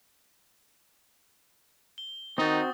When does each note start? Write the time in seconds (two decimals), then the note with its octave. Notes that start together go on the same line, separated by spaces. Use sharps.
1.98 G7
2.38 D#3 C4 D#4 F#4 D#6 A6